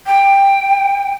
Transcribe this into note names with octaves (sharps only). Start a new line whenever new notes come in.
G5